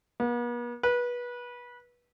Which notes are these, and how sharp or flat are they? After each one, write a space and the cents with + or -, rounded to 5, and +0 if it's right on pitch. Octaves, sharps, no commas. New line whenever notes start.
B3 -45
B4 -25